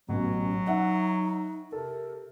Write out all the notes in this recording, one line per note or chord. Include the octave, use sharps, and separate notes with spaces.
A1 B2 F#3 C#4
D#4 E5 F#5
C3 A4 A#4